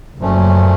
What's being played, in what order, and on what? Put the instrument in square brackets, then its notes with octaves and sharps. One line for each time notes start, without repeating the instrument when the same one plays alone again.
[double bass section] F#1 F#2 [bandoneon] A#2 F3 A3 C#4